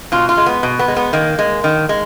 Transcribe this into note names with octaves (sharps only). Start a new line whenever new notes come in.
B2 F4
F4
G#3
B3
B2
B3
G#3
B3
D#3 A#3
G#3
D#3
G#3